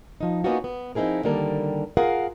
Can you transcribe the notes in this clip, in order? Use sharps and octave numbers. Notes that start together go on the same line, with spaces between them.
F3 D#4
A#3 B3 C#4 D#4 F4 F#4
B3
F3 C4 D#4 E4 G#4 A#4
D3 D#3 G3 A#3 A#4 A5
F4 G#4 A#4 F5 F#5